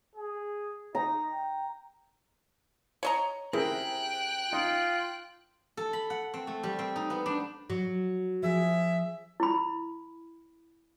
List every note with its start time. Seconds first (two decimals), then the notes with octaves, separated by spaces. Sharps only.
0.16 G#4
0.95 D#4 A#5
1.31 G5
3.03 C#5 D#5 A#5
3.53 C3 E4 G#4 A#4 G5 F#6
4.53 D#4 F4
5.77 A4
5.93 B5
6.10 F#5
6.34 C4
6.47 A3
6.63 G3
6.79 C4
6.96 D#4
7.10 B3
7.26 D4
7.70 F#3
8.43 F3 G#4 E5
9.40 E4 B5